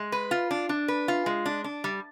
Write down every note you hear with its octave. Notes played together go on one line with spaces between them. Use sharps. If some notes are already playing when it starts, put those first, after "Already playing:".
Already playing: G#3
B4
F4
D4
D4
B4
F4
G#3
D4
D4
G3